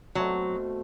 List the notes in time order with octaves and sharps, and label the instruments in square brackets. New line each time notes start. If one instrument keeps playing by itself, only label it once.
[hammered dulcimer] B2 A3 C4 [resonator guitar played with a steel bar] F#3